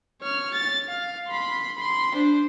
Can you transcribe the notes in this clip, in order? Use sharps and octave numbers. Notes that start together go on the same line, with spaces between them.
C#5 F6
A6
F5
B5 C6
B5 C6
D4 C5